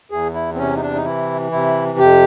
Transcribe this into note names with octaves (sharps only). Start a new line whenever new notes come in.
E2 G#4
E4
C4
C3 C#4
D#4
D4
D#4
E3 E4
C3 E4
F2 G4